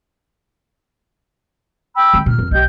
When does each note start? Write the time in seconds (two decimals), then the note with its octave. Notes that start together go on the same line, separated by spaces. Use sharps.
1.95 G5 B5 E6
2.14 D#3 G#3
2.26 A#2 F6
2.38 F2
2.51 B1 G4 D#5 G6